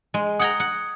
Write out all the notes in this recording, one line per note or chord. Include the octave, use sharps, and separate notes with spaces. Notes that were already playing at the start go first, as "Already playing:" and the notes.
G#3
F#5 G5 A#5 D#6 G#6
F#5